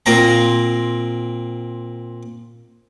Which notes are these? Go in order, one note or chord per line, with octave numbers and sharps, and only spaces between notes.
A#2 C4 A#5